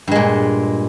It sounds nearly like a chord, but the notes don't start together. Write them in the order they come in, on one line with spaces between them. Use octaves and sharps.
G2 G#3 A#2